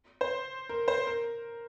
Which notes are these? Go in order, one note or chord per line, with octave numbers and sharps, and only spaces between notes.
C5
A#4
C5
A#4